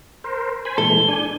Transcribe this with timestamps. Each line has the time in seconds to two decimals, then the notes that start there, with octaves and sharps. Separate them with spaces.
0.24 A#4 C5
0.65 C5 G#5 B5
0.78 A#2 E3 G#3 A4 G7
1.08 D4 G#5